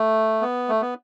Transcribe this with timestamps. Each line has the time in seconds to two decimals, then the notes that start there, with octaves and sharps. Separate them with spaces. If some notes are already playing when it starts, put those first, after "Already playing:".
Already playing: A3
0.41 B3
0.69 A3
0.82 B3